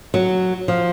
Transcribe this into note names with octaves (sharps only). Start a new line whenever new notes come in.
F#3
F3